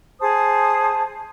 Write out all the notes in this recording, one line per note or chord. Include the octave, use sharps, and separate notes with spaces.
G#4 C5 A5 D#6